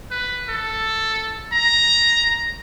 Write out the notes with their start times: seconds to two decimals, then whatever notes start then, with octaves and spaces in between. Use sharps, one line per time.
0.11 B4
0.49 A4
1.53 A#5